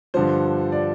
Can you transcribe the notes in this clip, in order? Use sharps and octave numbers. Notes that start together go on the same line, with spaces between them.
G2 D3 F3 C5
D5